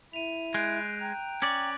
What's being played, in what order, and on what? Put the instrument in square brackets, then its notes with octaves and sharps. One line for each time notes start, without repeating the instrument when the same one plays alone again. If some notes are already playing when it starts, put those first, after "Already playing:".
[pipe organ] E4 E5 [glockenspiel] D#7 F7
[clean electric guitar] G#3 [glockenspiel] F#6 G6 D7
[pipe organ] G5 A#5
[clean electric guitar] C#4 D5 [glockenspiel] D6 F#7